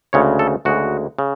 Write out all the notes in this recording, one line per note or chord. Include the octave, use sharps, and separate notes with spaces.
D2 C#3 G#3 C#5
A4
D2 C#3 G#3 F#4
C#3